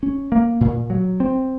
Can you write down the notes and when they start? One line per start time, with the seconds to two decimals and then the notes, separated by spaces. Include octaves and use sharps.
0.03 C#4
0.32 A#3
0.61 A#2
0.90 F#3
1.20 C4